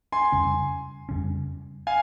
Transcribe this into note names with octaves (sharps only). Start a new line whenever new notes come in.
G#5 C6
F2 C#3 G3 C#4
F2 C#3 G3 C#4
F5 G#5